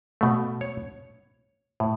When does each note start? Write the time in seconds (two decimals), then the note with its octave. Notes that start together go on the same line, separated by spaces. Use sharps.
0.21 B2 A3
0.61 C#5
1.80 A2